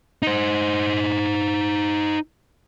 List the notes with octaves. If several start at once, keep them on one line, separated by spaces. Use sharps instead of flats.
D#4 C5